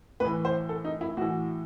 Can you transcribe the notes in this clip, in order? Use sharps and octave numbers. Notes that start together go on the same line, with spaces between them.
A2 E3 B4
C5
A4
D#4
E4
A2 E3 F#4